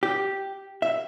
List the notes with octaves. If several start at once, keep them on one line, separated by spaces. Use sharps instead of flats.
G4
E5